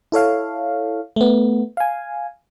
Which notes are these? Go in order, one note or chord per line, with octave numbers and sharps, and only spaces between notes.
E4 A4 C#5 F5
A3 B3
F5 G#5